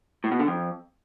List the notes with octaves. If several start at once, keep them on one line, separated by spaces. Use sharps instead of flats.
A2
B2
D3
F2